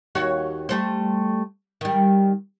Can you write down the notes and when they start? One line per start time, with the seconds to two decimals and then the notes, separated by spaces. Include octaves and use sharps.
0.15 D#2 F#4 C#5
0.69 G3 A3 C5
1.81 D#3 G3